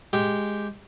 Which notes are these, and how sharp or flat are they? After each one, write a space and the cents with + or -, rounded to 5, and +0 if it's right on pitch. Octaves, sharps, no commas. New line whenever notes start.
G#3 +0 G4 +0